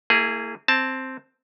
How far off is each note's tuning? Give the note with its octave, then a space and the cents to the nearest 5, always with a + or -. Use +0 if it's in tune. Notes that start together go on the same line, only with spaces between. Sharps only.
A#3 -35 E4 +0 G#4 +0
C4 +0 A5 +0